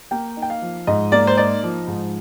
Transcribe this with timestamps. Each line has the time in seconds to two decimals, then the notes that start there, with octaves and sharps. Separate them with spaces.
0.11 A#3 G5
0.37 D#4
0.42 G5
0.50 F5
0.62 F3
0.87 G#2 D#5
1.12 A#3 D5
1.27 C5
1.37 D#4 D5
1.63 F3
1.87 G#2